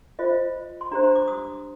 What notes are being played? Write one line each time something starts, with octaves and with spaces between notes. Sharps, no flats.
F4 C5 D#5
C6
D4 G4 C5 A#5
C6
D6
D#6